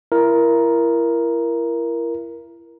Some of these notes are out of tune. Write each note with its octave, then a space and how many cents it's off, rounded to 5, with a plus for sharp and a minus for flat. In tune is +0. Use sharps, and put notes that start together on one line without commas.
E4 +35 A#4 +10